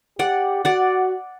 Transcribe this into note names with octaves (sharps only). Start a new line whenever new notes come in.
G4 D5 F#5
F#4 D5 F#5